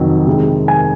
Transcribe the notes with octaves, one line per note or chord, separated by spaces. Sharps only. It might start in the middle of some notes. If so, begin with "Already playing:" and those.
Already playing: F2 C3 D#3 F#3
C3 D#3 G#3
G#5